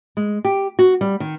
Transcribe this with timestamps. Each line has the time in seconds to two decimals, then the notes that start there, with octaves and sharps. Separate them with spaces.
0.17 G#3
0.45 G4
0.79 F#4
1.01 G3
1.20 D#3